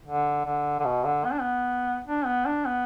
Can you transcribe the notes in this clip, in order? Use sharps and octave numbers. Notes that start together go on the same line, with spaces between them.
D3
D3
D3
B2
D3
B3
D4
B3
D4
B3
D4
B3